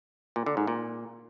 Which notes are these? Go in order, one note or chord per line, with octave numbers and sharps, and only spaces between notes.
A#2
D3
G#2
A#2